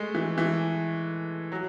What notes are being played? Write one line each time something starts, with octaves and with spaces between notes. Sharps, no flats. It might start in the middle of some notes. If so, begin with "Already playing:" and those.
Already playing: G#3 A3
E3
E3
F#3